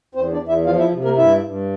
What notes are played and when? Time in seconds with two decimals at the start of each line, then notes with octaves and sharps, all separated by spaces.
0.15 E2 C4 C5
0.32 D4 D5
0.40 E2
0.49 E4 E5
0.66 F3 F4 F5
0.79 E4 E5
0.92 C3
1.04 A#3 A#4
1.17 G2 E4 E5
1.44 G2